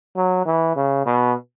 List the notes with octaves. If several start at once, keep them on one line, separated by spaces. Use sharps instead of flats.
F#3
E3
C#3
B2